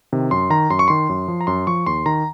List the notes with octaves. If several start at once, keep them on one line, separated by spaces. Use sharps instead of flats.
C3 D#3
F#2 C6
D#3 A#5
F#2 C6
C#6
D#3 C6
F#2
F3
A#5
F#2 C6
F3 C#6
D#2 C6
D#3 A#5